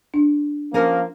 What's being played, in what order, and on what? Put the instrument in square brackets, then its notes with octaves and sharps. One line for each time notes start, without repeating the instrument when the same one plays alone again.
[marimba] D4
[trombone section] F3 A#3 [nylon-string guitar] C#4 A#4